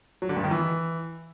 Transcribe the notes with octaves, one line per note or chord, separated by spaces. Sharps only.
F#3
D3
G2
D#3
E3